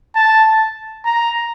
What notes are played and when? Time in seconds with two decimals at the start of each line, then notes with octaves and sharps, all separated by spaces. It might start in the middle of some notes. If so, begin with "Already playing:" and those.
0.16 A5
1.05 A#5